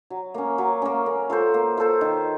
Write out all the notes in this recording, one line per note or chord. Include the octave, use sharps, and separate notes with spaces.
F#3
A#3 C#4
F#3
A#3 C#4
A#3
F4 A4 C5
A#3
F4 A4 C5
D#3